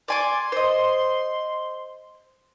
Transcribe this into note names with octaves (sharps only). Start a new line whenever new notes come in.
D5 G#5 C6 D6
C5 D#5